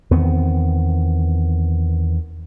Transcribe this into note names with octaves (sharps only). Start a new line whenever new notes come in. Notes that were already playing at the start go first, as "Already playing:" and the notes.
E2 D#3 B3 C4